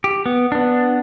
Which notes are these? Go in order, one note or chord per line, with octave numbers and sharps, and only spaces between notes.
G4
B3
B3 D4